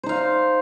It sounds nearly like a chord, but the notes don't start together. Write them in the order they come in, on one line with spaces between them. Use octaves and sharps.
C5 D#4 F5